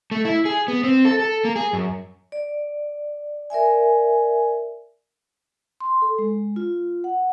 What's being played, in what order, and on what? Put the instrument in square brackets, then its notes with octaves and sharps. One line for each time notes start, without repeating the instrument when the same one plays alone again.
[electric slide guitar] A3
E4
G#4
B3
C4
A4
A4
A#3
G#4
F#2
[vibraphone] D5
A#4 D5 E5 G#5
C6
A4
G#3
F4
F#5